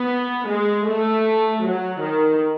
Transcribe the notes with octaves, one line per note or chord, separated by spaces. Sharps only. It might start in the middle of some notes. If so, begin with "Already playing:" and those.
Already playing: B3
G#3
A3
F#3
D#3